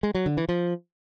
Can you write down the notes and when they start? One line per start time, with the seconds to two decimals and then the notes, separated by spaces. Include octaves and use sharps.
0.03 G#3
0.15 F#3
0.26 D3
0.37 E3
0.49 F3